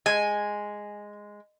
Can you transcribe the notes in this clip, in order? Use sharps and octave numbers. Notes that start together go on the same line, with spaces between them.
G#3 G#5